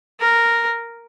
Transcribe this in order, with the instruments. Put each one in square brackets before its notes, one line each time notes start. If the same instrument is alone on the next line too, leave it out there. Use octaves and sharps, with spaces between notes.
[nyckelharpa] A#4